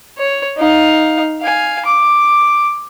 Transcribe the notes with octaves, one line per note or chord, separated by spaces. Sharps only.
C#5
D#4 F5
F5 G#5
D6